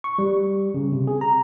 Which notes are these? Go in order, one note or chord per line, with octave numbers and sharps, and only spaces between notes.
C#6
G3
C#3
C3
G#4
A#5